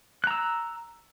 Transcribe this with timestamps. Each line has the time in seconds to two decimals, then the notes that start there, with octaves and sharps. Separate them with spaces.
0.24 F#6
0.27 A#5
0.31 E6